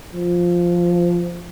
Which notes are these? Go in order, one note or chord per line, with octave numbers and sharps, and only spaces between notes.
F3